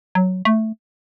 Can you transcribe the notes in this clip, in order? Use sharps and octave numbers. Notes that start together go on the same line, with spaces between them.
F#3
A3